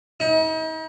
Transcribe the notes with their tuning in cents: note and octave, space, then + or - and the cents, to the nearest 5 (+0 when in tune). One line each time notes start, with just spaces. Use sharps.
D#4 +40